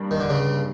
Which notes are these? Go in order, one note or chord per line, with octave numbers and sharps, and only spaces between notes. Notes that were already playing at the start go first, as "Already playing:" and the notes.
Already playing: G2 G3 A#3 D4
D#3
D3
C#2 C#3